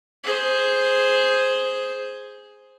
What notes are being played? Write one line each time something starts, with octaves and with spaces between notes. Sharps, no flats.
G#4 C5